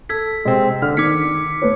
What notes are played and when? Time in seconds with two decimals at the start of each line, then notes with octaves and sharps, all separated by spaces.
0.09 A4 E6 G#6 B6
0.45 C3 G#3 C4
0.82 D3 F6
0.97 D#3 D6 G#6 B6 C#7
1.62 A3 B4 C#5